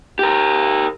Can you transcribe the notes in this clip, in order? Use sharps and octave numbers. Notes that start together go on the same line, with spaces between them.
G4 A#4